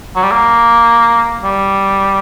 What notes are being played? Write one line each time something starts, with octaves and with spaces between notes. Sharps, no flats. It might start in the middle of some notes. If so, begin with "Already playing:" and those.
F#3
G3
A#3
G3